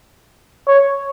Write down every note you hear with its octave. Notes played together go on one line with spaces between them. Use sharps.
C#5